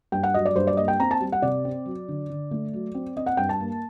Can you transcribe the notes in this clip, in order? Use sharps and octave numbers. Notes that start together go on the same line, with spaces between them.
G2 G5
F#5
F#3 D#5
D5
G2 C5
D5
A#3 D#5
G5
C4 A#5
A5
G3
F#5
C3 D5
C4
F#3
D3
D3
A3
F#3
C4
C4 D#5
F#5
G2 G5
A5
A#3